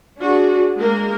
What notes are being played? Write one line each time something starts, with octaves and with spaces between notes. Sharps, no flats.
D4 F#4 G#4
G#3 A#3 A#4